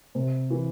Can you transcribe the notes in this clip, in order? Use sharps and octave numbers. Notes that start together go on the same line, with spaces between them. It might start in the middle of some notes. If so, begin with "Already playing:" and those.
C3
E3